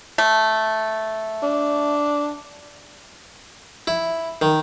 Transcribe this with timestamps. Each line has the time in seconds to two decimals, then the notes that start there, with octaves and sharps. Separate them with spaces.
0.18 A3
1.43 D4
3.87 E4
4.42 D#3